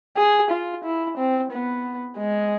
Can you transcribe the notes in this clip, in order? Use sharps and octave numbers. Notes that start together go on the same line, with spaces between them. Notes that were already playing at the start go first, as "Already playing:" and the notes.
G#4
F4
E4
C4
B3
G#3